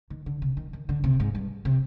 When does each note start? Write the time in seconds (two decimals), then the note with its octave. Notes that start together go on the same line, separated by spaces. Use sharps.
0.10 D#3
0.26 D3
0.42 C3
0.57 D#3
0.73 D#3
0.89 D3
1.04 C3
1.20 G#2
1.35 G2
1.65 C3